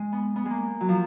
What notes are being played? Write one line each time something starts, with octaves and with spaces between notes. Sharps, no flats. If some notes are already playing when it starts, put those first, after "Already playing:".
Already playing: G#3
B3
B3
G#3 A#3
F#3
F3